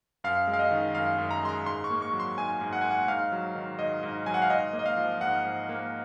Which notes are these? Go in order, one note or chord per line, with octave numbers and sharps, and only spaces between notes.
F#2 F5
G#3
F5
D#5
D#3
F#2 F5
F#2
A#5
G#3 C6
A#5
G#2 C6
C#6
A#3
C#6
F#3
C6
G#2 G#5
G#2
F#5
A#3 G#5
F#5
G#2 F5
F#3
D#3
G#2 D#5
G#2
F#3 G#5
F#5
F5
G#2 D#5
A#3
D#5
F5
F3
G#2 F#5
G#2
A#3